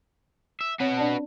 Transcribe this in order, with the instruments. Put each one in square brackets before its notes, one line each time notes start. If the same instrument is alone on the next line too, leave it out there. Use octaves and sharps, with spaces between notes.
[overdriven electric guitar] E5
[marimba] C4 C#5 [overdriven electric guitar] F#4 B4
[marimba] D4 D5 A5